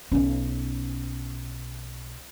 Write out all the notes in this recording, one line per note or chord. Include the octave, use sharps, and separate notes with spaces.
B1 C#4